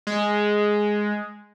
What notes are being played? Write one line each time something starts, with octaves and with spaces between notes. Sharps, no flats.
G#3